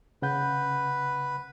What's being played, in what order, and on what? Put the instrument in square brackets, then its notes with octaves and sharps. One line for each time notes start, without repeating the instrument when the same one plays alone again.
[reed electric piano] C#3 F#5 G6 [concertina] B4